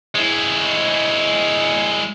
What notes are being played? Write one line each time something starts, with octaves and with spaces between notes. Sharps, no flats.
G#3 E4